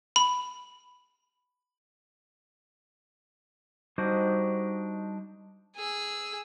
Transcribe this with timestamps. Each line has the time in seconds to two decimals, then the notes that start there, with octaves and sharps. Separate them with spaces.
0.16 B5
3.98 G3 D4 D#4 F#4 C5 D#5
5.76 G#4 E6